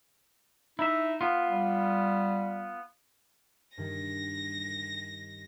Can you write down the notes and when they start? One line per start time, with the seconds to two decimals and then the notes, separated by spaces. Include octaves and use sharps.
0.79 D#4 E4 E5
1.21 B3 F4
1.49 G3
3.77 G2 D#3 A#6